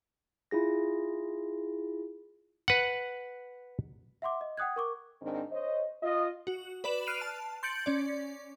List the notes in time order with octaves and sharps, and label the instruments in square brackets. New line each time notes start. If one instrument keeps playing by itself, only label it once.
[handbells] E4 F4 G#4 A#6
[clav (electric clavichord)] B4 F#5
[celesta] E5 F#5 C6 D6
D#5
F#5 G5 D#6 F#6 G#6
A#4 C#6 D6
[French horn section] G#2 D#3 C4 D4
C5 C#5 D#5
F4 D#5
[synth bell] F#4
B4 D5 B5 E7 F#7
F6 F#6 C7 D7 D#7 F7
A5
C6 G6 A6 C#7 D7 F#7
C#4 D5